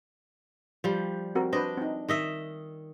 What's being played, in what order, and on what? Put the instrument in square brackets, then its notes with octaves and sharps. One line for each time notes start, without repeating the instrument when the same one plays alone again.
[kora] F3 G3
[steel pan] C4 F#4 A#4
[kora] D4 D#5 [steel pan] B4 C5
[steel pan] C4 D#4
[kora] D#3 D#5 E5